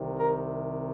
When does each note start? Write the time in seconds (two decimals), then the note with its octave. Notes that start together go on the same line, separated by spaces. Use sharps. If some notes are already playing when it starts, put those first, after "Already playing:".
Already playing: C2 C3 D#3
0.19 A#4